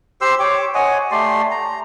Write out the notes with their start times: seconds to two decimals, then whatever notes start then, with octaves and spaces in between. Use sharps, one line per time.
0.21 G4 C5 C6 E6
0.39 G4 C#5 D6
0.75 C#5 D#5 F#5 G#5
1.11 A3 G4 D5 C6
1.51 A#5